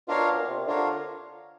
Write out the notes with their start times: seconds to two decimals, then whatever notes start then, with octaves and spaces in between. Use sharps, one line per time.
0.07 B2 D4 F4 A#4 C#5 F5
0.28 A#2
0.48 C3
0.67 D3 D4 F4 A#4 C#5 F5